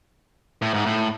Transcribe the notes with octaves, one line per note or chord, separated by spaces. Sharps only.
A2
G#2
A2